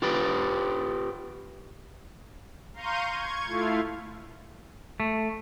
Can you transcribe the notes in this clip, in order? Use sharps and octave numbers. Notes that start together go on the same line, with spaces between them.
F4 G4 B4
F5 A#5 C6 C#6 G6 D#7
C#6 G#6
A3 E4 F4 F5
A3